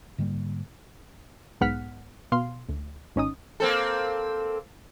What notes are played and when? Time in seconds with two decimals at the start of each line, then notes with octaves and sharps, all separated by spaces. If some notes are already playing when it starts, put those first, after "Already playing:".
0.18 G#2 D3 G3 A#3
1.61 B1 G#2 B3 F#5 F6 B6
2.32 B2 F5 C6
2.69 D2
3.16 G#1 C#4 D#4 D#6
3.60 A#3 C4 A4